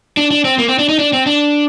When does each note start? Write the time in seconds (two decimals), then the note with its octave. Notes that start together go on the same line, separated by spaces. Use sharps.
0.17 D4
0.31 D4
0.45 C4
0.58 A#3
0.68 C4
0.79 D4
0.89 D#4
0.99 D4
1.13 C4
1.26 D4